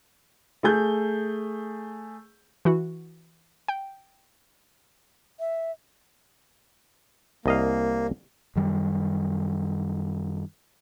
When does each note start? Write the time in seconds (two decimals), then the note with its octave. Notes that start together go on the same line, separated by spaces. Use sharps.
0.63 A3 G#4 G6
2.65 E3 F#4
3.68 G5
5.40 E5
7.46 C2 A#3 D#5 F5
8.56 F#2 D#3 G3